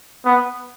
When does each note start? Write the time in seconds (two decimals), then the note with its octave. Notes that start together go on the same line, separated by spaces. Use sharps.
0.25 B3